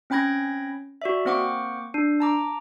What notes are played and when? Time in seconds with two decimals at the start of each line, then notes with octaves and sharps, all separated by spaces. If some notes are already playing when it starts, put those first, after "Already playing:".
0.10 C4 C#4 G5 B5 G#6 A#6
1.02 F#4 D5 E5
1.25 A#3 C4 C5 F#5 C#6 D6
1.94 D4
2.20 A5 A#5 D6